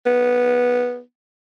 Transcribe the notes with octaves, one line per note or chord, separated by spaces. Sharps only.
B3